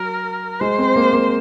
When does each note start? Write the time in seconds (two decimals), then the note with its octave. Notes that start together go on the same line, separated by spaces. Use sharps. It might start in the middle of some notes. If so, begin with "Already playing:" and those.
Already playing: F#3 A#4
0.61 G#3 C5
0.78 C4
0.96 A#3
1.13 A#3